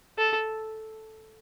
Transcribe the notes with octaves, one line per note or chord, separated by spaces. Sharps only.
A4